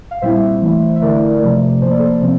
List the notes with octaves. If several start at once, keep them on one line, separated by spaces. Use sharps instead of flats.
F5
A#2 G3 C4 E4 C5 E5
E3 A3 E4
E5
D3 A3 E4 A#4 D5
C3 F3 A3
A2 F3 A#3 C5
D5
A4 C5
C3 F3 C4